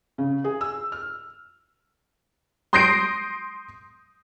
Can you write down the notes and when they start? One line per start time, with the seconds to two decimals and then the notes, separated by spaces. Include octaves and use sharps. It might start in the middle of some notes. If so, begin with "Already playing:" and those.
0.18 C#3
0.44 G#4
0.61 E6
0.92 F6
2.73 C6 D#6 G6 A#6 C7 D7